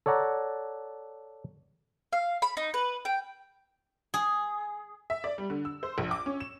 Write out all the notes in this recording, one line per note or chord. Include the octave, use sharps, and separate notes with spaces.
A4 C#5 D5 F#5 A#5
F5
B5
D#4
B4
G5
G#4
E5
D5
G3
D3
E6
C5
A#1
D6
C#4
E7